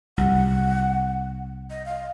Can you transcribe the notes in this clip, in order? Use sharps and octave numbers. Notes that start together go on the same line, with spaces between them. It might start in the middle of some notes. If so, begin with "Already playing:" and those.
C2 F#5
D#5
F5